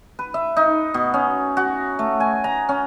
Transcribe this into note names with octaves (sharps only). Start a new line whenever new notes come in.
B4
E5
D#4
B2
C#4
F#4
A3
G#5
A#5
C#4